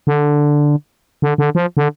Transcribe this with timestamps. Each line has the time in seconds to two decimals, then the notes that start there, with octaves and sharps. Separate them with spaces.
0.07 D3
1.22 D3
1.38 D3
1.55 F3
1.77 D3